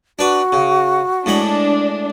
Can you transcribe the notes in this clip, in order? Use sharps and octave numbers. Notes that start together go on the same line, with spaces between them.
D4 F#4 B4
C#3
A2 G#3 D4 B5